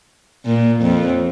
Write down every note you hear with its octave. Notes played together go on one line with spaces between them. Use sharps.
A#2
F2